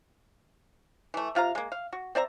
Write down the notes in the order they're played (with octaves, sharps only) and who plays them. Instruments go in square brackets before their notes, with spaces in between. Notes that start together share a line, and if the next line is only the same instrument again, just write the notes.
[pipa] E3 A3
C3 F4 F5 A#5
G#3 A#3
F5
F#4
C4 D5 E5 A#5